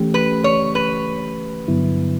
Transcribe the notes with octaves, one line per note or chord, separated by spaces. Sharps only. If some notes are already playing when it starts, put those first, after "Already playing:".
Already playing: E3 A3 C#4 G4
B4
C#5
B4
G2 D3 F#3 B3 E4